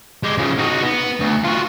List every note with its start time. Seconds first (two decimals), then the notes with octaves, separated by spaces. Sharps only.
0.23 G#3 G4
0.38 C#3 F3
0.58 D#4 F#4
0.82 B3
1.20 D2
1.44 F4 F#4